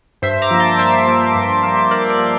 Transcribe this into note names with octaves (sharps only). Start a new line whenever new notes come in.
G2 C5 E5
A#5 D6
F3 A#3
A5 C6
G2 C5 E5
F3 A#3
G2
F3 A#3
G2 A#4 D5
A#4 D5
F3 A#3